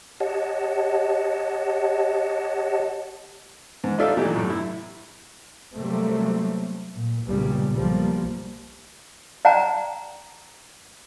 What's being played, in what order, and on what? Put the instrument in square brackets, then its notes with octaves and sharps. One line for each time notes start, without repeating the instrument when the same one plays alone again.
[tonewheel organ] G4 C#5 D#5 F#5 A5
[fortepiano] G#2
D#4 F4 A4 D5 E5 F5
A#2 E3 F#3 A3 D#4 G4
F#2 A2
E4
[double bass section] C3 F#3 G3 A3 A#3 C4
A#2
B1 G2 A#2 C#3 G3
B1 F3 G3 A#3
[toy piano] D5 F#5 G5 A5 A#5